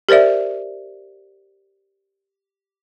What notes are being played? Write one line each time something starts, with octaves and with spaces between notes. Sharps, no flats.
G4 A#4 C5 D5 E5